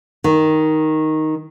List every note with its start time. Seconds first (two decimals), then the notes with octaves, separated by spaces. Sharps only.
0.24 D#3